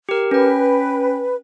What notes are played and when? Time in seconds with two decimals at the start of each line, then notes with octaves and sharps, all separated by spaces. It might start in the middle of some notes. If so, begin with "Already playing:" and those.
0.09 G4 A#4
0.31 C#4 B4 G5